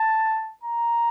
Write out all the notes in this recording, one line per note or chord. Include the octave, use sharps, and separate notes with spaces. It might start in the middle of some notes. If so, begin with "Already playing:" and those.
Already playing: A5
A#5